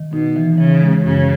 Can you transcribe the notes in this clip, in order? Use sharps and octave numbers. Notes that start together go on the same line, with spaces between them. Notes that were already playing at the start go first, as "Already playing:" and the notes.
Already playing: D#3
B2 D#4
E3
C#3 E3
G#3
F#2 C#3